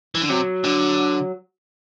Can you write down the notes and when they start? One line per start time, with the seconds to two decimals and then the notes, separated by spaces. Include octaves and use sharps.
0.15 E3
0.22 D3
0.30 C3 F#3
0.65 D3